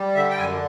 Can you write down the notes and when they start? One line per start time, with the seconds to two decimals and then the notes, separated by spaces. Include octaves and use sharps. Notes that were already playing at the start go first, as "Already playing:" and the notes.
Already playing: G3
0.15 D3 E5
0.30 G5
0.38 F#2 G#5